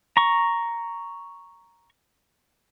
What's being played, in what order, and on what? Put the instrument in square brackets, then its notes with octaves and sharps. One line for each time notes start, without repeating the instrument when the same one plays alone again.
[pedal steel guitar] A#5 C#6